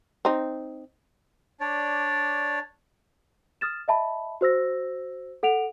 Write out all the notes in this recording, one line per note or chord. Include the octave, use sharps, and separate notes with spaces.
C4 D#4
D4 C#5 D5
D#6 F6 A6 E7
D#5 E5 A5 B5
F#4 C5 E6 A#6
A4 F#5 D7 F7